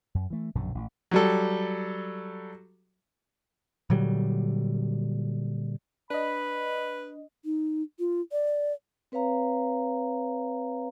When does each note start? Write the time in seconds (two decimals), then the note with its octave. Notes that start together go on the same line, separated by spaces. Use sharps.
0.15 F#2
0.30 E3 A3
0.55 A#1 F#2 B2 D3
0.75 A1
1.11 F#3 G3 A4
3.90 A#2 D3 F#3 G3
6.10 D4 B4 D#5 B5
7.45 D#4
7.99 F4
8.32 D5
9.12 C4 B4 C#5 F5 A#5